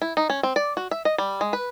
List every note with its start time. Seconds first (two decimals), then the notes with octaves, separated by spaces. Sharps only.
0.02 E4
0.17 D#4
0.30 C#4
0.43 C4
0.56 D5
0.77 F#4
0.91 E5
1.05 D#5
1.18 G3
1.41 G#3
1.53 B4